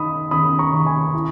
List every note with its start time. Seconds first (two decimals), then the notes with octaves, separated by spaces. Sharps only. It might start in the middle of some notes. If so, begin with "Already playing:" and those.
Already playing: D#3 D#4 B5 D#6
0.31 D#3 B5 D#6
0.59 A#5 C#6
0.73 D#3
0.86 G#5 B5
1.14 E4